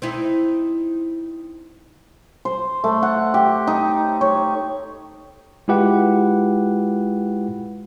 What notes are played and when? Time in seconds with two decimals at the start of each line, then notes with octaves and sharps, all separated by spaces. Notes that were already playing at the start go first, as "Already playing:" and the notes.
0.02 C4 D#4 E4
2.45 C5
2.84 A3
3.03 F#5
3.34 G4
3.67 D#4
4.21 C#5
5.68 G#3 E4 F4 G4 B4 F#5